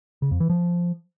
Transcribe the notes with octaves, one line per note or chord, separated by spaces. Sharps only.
C#3
F2
E3
F3